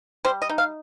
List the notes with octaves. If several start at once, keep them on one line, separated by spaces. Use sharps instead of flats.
G3 C5
D#5
D#4
F5